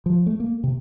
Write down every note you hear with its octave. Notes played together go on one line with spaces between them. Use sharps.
F3
A3
A#3
C3